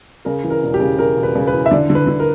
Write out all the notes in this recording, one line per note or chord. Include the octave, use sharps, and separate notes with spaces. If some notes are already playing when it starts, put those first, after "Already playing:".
C#3 A#4
E3
A#4
E1
G4
C#3
C#3 A#4
E1
B4
C#3
B4
E3
E5
D3 D5
D3
B4
D3
A#4